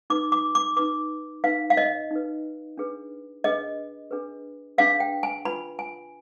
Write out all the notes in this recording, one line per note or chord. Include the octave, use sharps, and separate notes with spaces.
D#4 B4 D6
D6
D6
D#4 B4 D6
D#4 B4 F5
F5
D#5
D#4 B4
D4 G#4 B4
D4 G#4 B4 D#5
D4 G#4 B4
D4 G#4 B4 F5
G5
G#5
F4 B4 B5
G#5